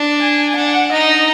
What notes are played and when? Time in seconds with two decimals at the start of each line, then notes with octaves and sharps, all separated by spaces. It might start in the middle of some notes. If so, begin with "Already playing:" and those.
Already playing: D4
0.21 G#5
0.56 D4 F#5
0.93 D#4 D#5